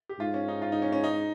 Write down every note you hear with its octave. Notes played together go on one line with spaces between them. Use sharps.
G4
G#2 F4
C#4
D#4
F4
D#4
C#4
C#4
D#4